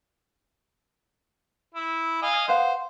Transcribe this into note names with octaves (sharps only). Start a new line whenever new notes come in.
E4
D#5 F5 G#5
B4 C5 F5 F#5